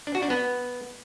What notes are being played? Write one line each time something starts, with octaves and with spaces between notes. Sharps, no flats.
D4
F#4
D4
B3